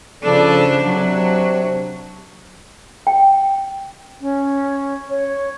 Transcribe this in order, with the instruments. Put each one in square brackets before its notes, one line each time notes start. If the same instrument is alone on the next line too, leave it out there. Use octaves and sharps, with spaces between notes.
[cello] C#3 D4 [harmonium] F3 A4 D5
[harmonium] C3 D4 [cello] F#3
[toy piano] G5
[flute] C#4
C#5